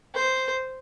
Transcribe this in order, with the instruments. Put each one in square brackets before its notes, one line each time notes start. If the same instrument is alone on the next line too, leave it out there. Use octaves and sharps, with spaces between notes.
[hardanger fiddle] C5